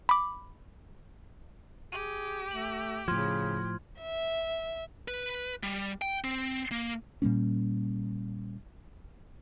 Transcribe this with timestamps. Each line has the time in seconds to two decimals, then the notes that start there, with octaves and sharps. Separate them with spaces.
0.09 B5 D6
1.92 G4 G#4 D#7
2.51 A3 F#7
3.08 A2 C#3 F3 C6 F6 G#6
4.01 E5
5.08 B4
5.63 G3
6.02 G5
6.24 C4
6.71 A#3
7.22 A#2 G3 A#3 C#4